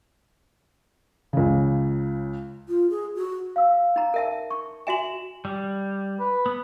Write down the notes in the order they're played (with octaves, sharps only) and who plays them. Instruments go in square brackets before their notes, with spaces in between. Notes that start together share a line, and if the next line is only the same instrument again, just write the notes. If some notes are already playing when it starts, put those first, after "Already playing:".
[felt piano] C#2 C#3
[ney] F4
G#4
F#4
[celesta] F5 E6
[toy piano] D#4 A#5
A#4 E5 A5
[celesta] C#6
[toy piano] F#4 E5 G#5 [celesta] E7 F#7
[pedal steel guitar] G3
[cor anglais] B4
[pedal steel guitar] B3